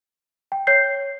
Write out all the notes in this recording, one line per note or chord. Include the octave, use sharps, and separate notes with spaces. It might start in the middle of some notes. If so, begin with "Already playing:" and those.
G5
C#5 G6 C7